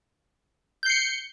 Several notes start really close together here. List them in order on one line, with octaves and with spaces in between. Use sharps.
G6 C7 C#7